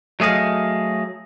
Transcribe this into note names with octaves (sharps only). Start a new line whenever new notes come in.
F#3 A3 G#4 D#5 F5